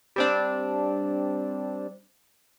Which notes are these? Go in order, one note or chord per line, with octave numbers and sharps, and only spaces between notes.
G3 C4 D4